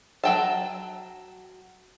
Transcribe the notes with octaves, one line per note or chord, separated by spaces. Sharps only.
F#3 G5 A5